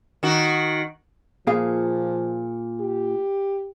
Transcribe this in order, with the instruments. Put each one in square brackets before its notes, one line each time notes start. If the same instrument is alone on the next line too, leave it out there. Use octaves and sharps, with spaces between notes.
[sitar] D#3 F#4
[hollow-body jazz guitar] A#2 G#4 F5 [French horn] F3
[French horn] G4